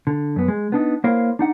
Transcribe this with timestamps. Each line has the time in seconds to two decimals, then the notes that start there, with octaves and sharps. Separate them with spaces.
0.07 D3
0.36 F#2 B3
0.48 G#3
0.72 B3 D4 D#4
1.04 A#3 E4 A#4 C5 C#5 F5
1.39 D4 D#4 F#5